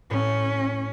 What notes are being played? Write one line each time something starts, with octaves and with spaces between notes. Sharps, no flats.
A2 C#4